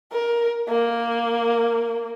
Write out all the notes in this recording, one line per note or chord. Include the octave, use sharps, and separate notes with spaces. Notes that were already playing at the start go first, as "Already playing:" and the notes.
A#4
A#3